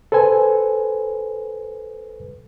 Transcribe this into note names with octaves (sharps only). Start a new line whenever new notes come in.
A4 B4 C5 G#5